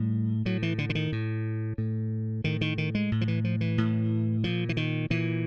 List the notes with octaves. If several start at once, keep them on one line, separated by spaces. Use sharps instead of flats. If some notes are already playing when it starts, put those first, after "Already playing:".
Already playing: A2 G3
A2 F#3
E3
D3
D3
D#3
A2
A2
A2 D#3
D#3
D#3
G#3
A2
F3
E3
F3
E3
A2
A#2 F3
E3
D#3
A#2 E3